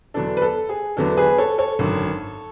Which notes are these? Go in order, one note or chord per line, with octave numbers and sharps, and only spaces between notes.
E2 D3 F#3 B3 D4 A4
B4
A4
G#4
E2 D3 F#3 B3 D4 A4
G#4 B4
A4 C#5
A4 C#5
G#1 F#2 D3 F#3